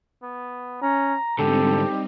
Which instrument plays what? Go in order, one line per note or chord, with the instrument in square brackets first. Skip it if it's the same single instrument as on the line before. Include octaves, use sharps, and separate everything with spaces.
[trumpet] B3
[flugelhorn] C#4 [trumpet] A#5
[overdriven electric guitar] G#2 D3 [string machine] G3 C4 D#4 [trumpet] G4 [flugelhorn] A4